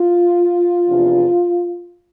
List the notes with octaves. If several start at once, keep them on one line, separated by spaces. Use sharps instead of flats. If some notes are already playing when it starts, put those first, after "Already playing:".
Already playing: F4
E2 C3 F3 B3 D4